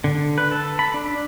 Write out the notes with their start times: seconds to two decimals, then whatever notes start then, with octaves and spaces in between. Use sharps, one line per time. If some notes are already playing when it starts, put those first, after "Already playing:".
0.04 D3
0.38 B4
0.51 A4
0.79 B5
0.94 D4